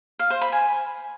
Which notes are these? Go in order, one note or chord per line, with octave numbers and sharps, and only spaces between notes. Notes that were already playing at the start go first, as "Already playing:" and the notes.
F5
C5
B5
G#5